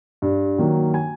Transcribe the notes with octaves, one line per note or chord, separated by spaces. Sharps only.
G2
D#3 F#3 A#3
G#5